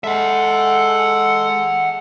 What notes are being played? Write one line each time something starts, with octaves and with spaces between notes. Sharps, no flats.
G#3 A4 E5 F#5